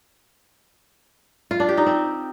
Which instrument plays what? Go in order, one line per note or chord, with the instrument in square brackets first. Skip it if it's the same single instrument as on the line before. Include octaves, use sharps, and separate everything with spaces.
[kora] F4
D4
G4
D#4
C4